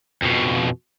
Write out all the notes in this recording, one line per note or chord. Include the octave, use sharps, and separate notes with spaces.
F2 B2